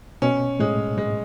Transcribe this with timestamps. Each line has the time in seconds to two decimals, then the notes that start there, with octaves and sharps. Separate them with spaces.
0.22 B2 C#4
0.60 A2 G#3
0.97 G#2 G#3